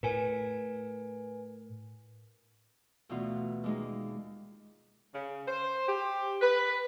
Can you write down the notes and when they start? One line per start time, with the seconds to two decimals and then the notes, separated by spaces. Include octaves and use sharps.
0.03 A2 A#4 B4 G#5
3.09 D2 B2 E3 B3 F4
3.64 D#2 G#3 D#4
5.14 C#3
5.47 C5
5.88 G4
6.42 B4